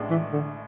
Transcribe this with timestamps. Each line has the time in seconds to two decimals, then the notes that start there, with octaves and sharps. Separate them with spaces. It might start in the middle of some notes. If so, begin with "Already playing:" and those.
Already playing: A1 A2 G#3 D4
0.10 E3
0.33 D3